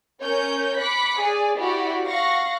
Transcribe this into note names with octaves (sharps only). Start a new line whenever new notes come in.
C#4 A#4 C#5 G6
B5 D6 F#6 B6 C#7
G#4 D5
E4 F#4 G4 D5
F5 F#5 C#6 A#6